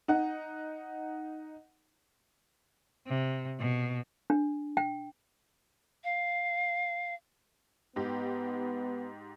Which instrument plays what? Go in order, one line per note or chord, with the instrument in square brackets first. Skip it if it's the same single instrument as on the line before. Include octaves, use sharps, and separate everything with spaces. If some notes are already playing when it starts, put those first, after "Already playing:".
[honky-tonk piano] D#4 F#5
[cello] C3
B2
[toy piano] D4
G5
[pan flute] F5
[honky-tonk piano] G#2 G4 [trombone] B3